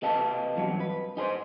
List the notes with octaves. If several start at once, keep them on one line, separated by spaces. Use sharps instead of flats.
C3 B4 D#5 F5 A5
E2 G2 F#3
B4
D#4 G#4 C5